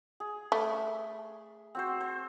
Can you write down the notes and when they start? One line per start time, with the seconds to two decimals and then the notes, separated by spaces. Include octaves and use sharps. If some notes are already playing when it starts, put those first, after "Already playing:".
0.20 G#4
0.52 A3
1.75 C4 F#4 C5
2.00 C5